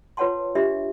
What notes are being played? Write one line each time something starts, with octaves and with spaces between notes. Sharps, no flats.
F4 B4 C#5 F#5 A5 C6
D4 F4 G4 A#4 D#5 E5